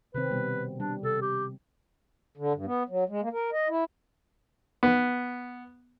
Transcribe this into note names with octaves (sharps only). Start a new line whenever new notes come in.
C3 D#3 C4 B4
B2 G3 B3
G3 D4
C3 A4
G4
D3
G2
B3
F#3
G#3
A#3
A#4
D#5
E4
B3